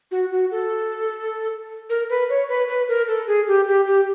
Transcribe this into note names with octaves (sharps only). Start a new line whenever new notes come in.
F#4
F#4
A4
A#4
B4
C#5
B4
B4
A#4
A4
G#4
G4
G4
G4